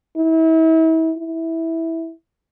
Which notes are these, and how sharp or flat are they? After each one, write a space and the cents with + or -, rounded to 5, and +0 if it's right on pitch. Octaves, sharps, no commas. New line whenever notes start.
E4 -35
E4 -10